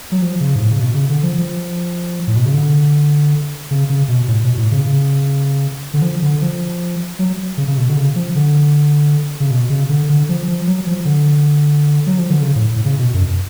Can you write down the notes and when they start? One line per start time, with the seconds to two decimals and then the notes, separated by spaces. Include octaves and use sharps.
0.12 F#3
0.22 F3
0.40 C#3
0.55 G#2
0.61 A2
0.71 C#3
0.80 B2
0.94 C#3
1.09 D3
1.23 F3
1.38 F3
2.27 A2
2.36 B2
2.45 C#3
2.54 D3
3.71 C#3
3.90 C#3
4.09 B2
4.28 A2
4.43 B2
4.57 A2
4.71 C#3
4.86 C#3
5.94 D3
6.02 F3
6.22 D3
6.42 F3
7.19 F#3
7.57 C#3
7.68 C#3
7.77 B2
7.89 D3
7.97 C#3
8.16 F3
8.35 D3
9.40 C#3
9.51 B2
9.70 C#3
9.89 D3
10.09 D3
10.29 F3
10.48 F3
10.67 F#3
10.87 F3
11.05 D3
12.07 F#3
12.18 F3
12.30 D3
12.42 C#3
12.55 A2
12.71 A2
12.85 C#3
12.99 B2
13.14 F#2